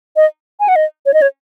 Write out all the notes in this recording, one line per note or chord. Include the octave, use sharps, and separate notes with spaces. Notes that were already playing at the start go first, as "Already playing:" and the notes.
D#5
G#5
F#5
D#5
C#5
D#5
C#5